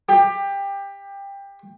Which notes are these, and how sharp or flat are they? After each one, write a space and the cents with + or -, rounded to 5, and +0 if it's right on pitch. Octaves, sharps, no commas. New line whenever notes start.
G4 +20